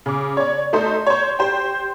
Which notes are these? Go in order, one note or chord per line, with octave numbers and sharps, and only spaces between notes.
C#3 D6
C#5 D5
A3 D#4 A4 C5
C5 C#5
G4 C5 G5